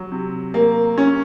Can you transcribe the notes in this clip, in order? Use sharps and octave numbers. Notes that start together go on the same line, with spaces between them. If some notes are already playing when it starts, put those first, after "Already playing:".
Already playing: F#3
C3
A#3
C#4